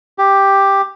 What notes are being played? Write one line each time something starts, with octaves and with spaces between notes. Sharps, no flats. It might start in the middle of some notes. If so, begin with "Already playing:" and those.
G4